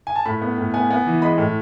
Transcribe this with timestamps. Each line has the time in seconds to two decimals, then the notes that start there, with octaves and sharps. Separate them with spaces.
0.07 G#5
0.16 A5
0.25 A2 B5
0.42 B3
0.58 A2
0.74 B3 G#5
0.90 B3
1.06 E3
1.22 G#3 B5
1.38 A2